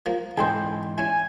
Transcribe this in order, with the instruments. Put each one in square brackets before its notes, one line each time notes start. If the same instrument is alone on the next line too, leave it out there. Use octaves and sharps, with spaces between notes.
[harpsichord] F3 A#3
[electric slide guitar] G#2 E3 [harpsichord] G#4 A4 C5 [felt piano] G5 C6 G6
[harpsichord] C#4 E4 [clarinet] G#5